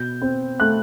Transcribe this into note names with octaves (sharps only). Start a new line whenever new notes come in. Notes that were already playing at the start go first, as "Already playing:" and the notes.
Already playing: B2 G6
C4
A3 F#6